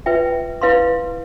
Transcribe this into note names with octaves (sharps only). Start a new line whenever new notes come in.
F4 B4 E5 G5
E4 B4 F5 C6